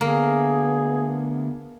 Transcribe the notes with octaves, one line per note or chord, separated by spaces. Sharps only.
D2 A#3 B3 G#4